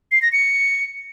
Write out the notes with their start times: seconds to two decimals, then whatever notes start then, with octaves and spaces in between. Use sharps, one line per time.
0.12 C7
0.22 A#6
0.32 C#7